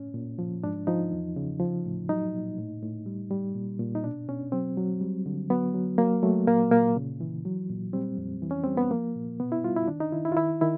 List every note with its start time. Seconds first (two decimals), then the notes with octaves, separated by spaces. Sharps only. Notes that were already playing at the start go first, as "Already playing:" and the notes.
Already playing: A2 C#4
0.14 A#2
0.39 F3
0.64 G#2 D4
0.87 F3 D#4
1.12 E2
1.36 C#3
1.60 F3
1.85 A2
2.09 F#3 D#4
2.34 A#2
2.58 A2
2.82 A2
3.06 G3
3.30 G3
3.56 A#2
3.79 A#2
3.95 D#4
4.03 B2 D4
4.28 B2 C#4
4.52 F#3 C4
4.77 F#3
5.01 G3
5.26 D3
5.50 F#3 B3
5.74 F#3
5.98 F#3 A#3
6.23 F#3 A3
6.47 A#2 A#3
6.71 A#2 A#3
6.96 C#3
7.21 E3
7.45 F#3
7.70 A#2
7.93 G3 C4
8.17 F2
8.42 E3
8.51 C#4
8.63 G3 C4
8.77 B3
8.91 F3 A#3
9.16 A#2
9.40 B2 B3
9.52 E4
9.64 G3 F4
9.77 E4
9.88 D#3 D4
10.00 D#4
10.12 D#3 E4
10.25 E4
10.32 F4
10.37 D#3 E4
10.61 D#3 E4